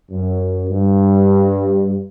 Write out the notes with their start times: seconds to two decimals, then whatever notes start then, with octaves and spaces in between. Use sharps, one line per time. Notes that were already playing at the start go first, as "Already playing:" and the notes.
0.11 F#2
0.70 G2